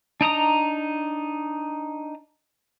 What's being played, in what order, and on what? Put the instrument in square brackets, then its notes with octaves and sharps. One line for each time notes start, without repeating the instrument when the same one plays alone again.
[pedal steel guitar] D4 D#4 A#5 D#6